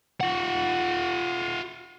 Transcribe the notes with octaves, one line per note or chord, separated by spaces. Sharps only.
F4 F#5